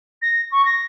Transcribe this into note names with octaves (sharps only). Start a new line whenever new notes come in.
A#6
C#6
A#6